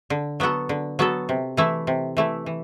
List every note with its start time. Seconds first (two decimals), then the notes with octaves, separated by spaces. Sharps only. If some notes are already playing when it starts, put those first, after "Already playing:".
0.10 D3
0.40 F#3 B3 F#4 A4
0.69 D3
0.99 F#3 B3 F#4 A4
1.29 C3
1.57 E3 A3 E4
1.87 C3
2.17 E3 A3 E4
2.46 E3